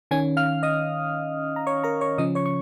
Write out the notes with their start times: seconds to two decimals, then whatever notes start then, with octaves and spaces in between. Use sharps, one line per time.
0.11 D#3 C#4 G#5 G#6
0.37 F5 F6
0.63 D#5 D#6
1.56 A#5
1.67 C#5 C#6
1.84 A#4 A#5
2.01 C#5 C#6
2.18 C#3 F3 C#4 D#5 D#6
2.35 C#5 C#6
2.46 C#6